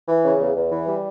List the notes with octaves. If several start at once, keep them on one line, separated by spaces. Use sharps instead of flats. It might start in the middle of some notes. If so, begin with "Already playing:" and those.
E3
C#3
E2
E2
E3
G3